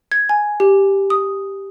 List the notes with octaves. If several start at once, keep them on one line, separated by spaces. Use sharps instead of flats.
G#6
G#5
G4
D#6